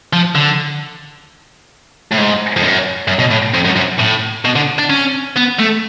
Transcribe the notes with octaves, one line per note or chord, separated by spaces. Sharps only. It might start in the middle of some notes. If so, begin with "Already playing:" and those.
F3
D3
A2
G#2
F2
F#2
F#2
B2
A2
F2
F#2
F#2
A2
B2
D3
D4
C#4
B3
A3